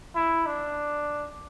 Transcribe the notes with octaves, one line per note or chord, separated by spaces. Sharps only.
E4
D4